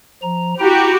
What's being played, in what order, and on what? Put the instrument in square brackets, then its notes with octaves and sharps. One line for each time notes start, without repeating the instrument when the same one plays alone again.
[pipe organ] F3 A#5
[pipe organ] E4 G5 A#5 [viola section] F#4 G4